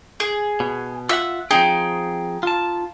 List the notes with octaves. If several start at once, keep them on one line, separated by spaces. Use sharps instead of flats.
G#4
B2
F4 E5 F#5 E6
F3 C4 D#4 G#4 G5
F4 A5